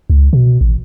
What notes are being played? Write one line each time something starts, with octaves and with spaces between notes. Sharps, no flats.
C#2
B2
A1